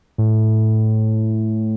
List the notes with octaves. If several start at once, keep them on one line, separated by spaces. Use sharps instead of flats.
A2